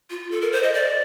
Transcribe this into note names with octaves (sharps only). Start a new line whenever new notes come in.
F4
A4
A#4
C5
D#5
D5